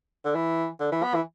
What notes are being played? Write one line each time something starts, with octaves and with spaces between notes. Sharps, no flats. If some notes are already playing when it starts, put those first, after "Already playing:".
D3
E3
D3
E3
B3
E3